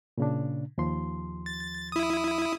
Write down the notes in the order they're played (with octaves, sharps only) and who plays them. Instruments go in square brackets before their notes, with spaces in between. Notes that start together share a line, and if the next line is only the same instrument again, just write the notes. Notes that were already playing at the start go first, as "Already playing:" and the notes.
[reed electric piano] A#2 C#3 D4
D#2 F3 C6
[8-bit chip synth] A6
E4 D#6